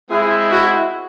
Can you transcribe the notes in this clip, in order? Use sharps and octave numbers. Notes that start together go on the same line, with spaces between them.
G#3 C4 E4 G#4
F#4